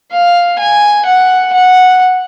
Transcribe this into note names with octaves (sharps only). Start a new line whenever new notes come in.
F5
G#5
F#5
F#5